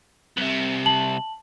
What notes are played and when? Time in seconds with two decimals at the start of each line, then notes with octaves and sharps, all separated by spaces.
0.37 C2 C3
0.86 A5 F#7